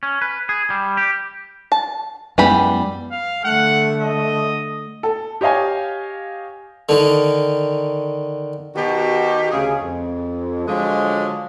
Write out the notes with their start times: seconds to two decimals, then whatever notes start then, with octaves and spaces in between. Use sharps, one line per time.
0.03 C#4
0.22 B4
0.49 G#4
0.70 G3
0.97 G4
1.72 A5
2.38 F#2 E3 G3 G#3 B3 B5
3.12 F5
3.45 D3 A3 F#5
4.02 D#5
5.03 A4
5.41 G4 C#5 D#5 F5 G#5
6.89 D3 D#3
8.76 B2 D#3 D#4 F#4 G4
9.52 D2 C#3 G#4
9.82 F2
10.67 D3 F3 F#3 G#3